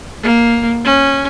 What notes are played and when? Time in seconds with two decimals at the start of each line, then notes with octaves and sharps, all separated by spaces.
0.23 A#3
0.84 C#4